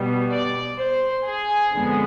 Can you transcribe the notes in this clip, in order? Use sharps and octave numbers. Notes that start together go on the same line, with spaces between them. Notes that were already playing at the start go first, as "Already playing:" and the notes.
Already playing: B2 G3 B3
D5
C5
G#4
F2 D3 G#3 B3